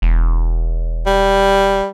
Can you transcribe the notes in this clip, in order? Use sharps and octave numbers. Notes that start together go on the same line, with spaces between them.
E1
G3